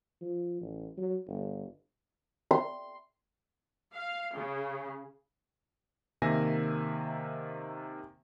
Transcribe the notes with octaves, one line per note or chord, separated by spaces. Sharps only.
F3
A1
F#3
G1
C6
F5
C#3
C3 D#3 A#3 E5 G#5 A#6